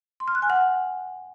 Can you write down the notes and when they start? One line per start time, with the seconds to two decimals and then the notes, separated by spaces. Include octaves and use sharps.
0.20 C6
0.28 F6
0.35 F#6
0.42 G#5
0.50 F#5